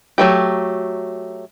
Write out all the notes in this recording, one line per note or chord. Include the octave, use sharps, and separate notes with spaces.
F#3 A3 G4